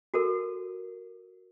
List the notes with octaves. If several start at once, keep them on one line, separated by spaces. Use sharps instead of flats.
F#4 A4 A#4